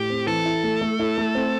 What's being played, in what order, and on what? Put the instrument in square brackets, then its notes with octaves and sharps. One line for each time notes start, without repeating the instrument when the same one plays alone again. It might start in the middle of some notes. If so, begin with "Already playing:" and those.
Already playing: [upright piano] A2 [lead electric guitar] G4
[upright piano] C4
[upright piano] E3 [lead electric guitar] A4
[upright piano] E4
A3
A3
E4
A3
C4